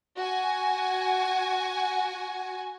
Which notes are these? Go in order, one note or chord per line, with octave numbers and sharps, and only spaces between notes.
F#4 G#5